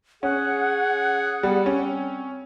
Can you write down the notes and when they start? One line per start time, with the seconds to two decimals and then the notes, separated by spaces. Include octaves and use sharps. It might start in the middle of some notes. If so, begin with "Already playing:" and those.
0.23 C#4 G#4 F#5
1.43 G3 B3
1.66 C4 C#4